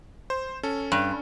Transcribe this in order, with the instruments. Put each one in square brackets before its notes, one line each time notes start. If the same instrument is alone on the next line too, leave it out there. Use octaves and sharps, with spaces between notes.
[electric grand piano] C5
C#4 A4
[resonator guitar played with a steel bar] G2